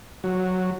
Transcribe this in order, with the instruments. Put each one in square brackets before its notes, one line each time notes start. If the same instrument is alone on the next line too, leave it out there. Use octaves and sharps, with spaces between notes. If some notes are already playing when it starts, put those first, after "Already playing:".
[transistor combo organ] F#3